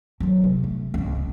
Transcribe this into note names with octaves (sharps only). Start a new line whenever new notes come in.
F#3 D#4
C3
A3
C#2 C4